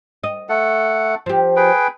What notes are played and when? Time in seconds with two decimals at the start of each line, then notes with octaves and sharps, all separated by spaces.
0.23 D#5
0.49 A3 A4 F#5
1.26 F3 G4
1.56 G#4 B4 G5